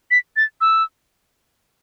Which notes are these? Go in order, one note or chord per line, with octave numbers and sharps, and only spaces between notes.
B6
A6
E6